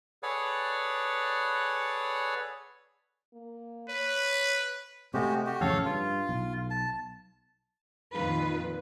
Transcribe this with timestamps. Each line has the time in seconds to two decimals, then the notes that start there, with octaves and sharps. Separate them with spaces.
0.23 G#4 A4 B4 C#5 D5 F#5
3.33 A#3
3.89 B4 C#5
5.14 C3 G#3 A3 F#4 G4
5.46 F#4 G4
5.61 A1 F2 C#3 A4 C#5 F5
5.85 G2 F4
6.29 B1
6.70 A5
8.12 F2 A#2 D#3 F4 B4